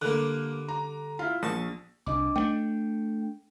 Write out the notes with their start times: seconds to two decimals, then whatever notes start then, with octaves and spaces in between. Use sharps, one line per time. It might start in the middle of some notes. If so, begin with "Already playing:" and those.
0.01 D3 G3 A#3 F#6
0.68 A#5
1.19 E4 F4
1.43 A#1 A5 C#6
2.06 C2 D4 D#5 D6
2.36 A3 B3 D4 G5